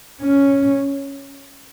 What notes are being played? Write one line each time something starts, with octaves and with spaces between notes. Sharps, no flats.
C#4